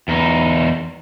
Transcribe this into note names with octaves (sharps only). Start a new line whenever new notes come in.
E2 D#4